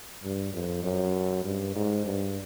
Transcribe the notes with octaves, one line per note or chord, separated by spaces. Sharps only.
G2
F2
F#2
G2
G#2
G2